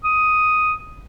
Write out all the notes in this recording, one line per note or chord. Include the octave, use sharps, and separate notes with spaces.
D#6